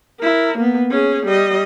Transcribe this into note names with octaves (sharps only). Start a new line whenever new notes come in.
E4 A#4
A#3 B3
C#4 G#4
G3 D#5